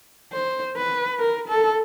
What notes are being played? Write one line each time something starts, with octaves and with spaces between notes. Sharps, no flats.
C5
B4
A#4
A4